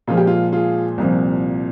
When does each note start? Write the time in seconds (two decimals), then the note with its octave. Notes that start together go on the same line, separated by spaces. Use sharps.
0.07 A#2 F3 G#3 F4
0.17 G4
0.27 F4
0.53 F4 G#4
0.98 C2 A#2 F3 C4